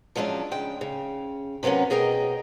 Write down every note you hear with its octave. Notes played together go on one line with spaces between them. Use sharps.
F3 F#3 G#3 C#4 D4
C#3 G#3 G5
C#3
C3 F#3 A#3 B3 C#4
B2 G#4 A#4 D#5 G5